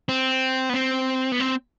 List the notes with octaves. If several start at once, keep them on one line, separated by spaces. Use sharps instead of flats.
C4
B3
C4
B3
C4